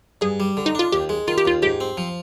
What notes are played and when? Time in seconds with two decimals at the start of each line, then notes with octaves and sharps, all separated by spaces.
0.21 G2 G#4
0.40 G3
0.57 D3
0.66 D#4
0.75 D4 F4
0.92 D#2 G4
1.09 G#3
1.28 D#3 F4
1.38 G4
1.45 D#2 F4
1.62 G#2 G4
1.81 C4
1.97 F3